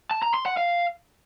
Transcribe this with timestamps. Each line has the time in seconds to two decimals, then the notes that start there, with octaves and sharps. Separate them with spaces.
0.11 A5
0.22 A#5
0.34 C6
0.46 F#5
0.57 F5